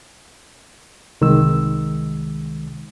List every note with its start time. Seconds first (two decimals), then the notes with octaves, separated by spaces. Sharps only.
1.21 C2 D#3 G#3 E6